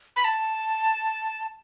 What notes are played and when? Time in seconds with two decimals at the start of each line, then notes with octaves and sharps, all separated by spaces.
0.16 B5
0.24 A5